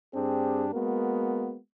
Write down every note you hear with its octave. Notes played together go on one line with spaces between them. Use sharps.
G2 C4 D4 G4 G#4
G#3 A#3 B3 F#4 A#4